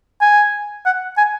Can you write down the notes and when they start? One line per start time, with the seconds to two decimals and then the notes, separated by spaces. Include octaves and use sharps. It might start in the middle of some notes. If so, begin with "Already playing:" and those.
0.21 G#5
0.86 F#5
1.18 G#5